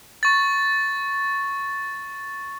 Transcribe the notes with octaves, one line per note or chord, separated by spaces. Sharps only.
C#6 A6